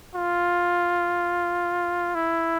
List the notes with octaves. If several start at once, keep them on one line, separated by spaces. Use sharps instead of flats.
F4
E4